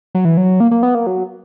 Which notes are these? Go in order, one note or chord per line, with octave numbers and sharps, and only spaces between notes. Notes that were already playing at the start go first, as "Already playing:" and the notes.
F#3
E3
F#3
A#3
A#3
B3
A#3
F#3